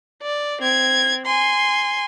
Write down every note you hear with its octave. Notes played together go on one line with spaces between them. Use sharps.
D5
C4 G#6
G#5 C6